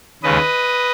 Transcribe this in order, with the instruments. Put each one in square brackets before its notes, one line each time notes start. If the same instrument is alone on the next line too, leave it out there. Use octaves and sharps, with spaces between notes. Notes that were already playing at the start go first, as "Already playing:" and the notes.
[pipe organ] D#2 C#3 G#3 B4 D#5